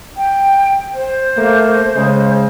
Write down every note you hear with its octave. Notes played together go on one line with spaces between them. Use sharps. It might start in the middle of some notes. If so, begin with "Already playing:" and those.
G5
C5
A3 A#3
C#3 G#3